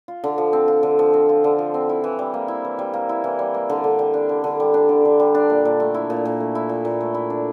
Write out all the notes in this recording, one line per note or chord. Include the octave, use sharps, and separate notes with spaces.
F4
D3
F3
C4
F4
D3
F3
C4
F4
D3
F3
C4
E4
E3
G3
A#3
E4
E3
G3
A#3
E4
E3
G3
A#3
D3
D3
G3
D4
D3
D3
G3
D4
D3
D3
G3
D4
A#2
A#2
A3
E4
A#2
A#2
A3
E4
A#2
A#2
A3
E4
D4